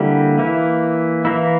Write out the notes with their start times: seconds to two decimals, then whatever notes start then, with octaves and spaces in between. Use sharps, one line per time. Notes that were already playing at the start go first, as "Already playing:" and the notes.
Already playing: D3 G3 A#3 E4 G4
0.38 E3 A#3 E4
1.25 E3 A#3 E4